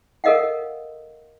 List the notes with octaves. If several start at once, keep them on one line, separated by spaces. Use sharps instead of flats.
A4 A#4 D#5 F5 F#5